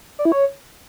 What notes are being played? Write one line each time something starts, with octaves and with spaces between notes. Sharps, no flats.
D5
E4
C#5